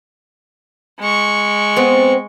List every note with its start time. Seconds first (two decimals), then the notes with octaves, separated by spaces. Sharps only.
1.00 G#3 C#6
1.76 B3 C4